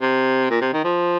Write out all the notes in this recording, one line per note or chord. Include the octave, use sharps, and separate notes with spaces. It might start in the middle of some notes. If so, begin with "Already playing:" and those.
C3
A#2
C3
D#3
F3